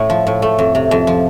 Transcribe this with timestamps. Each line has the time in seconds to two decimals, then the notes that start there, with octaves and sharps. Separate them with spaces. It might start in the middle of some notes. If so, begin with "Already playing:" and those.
Already playing: A2 A3
0.10 F3
0.27 A2
0.42 A3
0.59 F2
0.75 C3
0.91 F2
1.07 F3